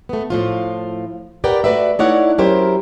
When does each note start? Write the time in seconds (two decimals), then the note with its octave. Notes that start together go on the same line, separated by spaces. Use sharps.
0.09 A3 B3
0.30 A2 F3 F4
1.44 G4 A#4 B4 D5 F#5 G5
1.64 A3 F#4 B4 D5 E5
1.99 A3 D#4 E4 C#5 D5 F#5
2.38 F#3 C#4 E4 G4 A#4 C5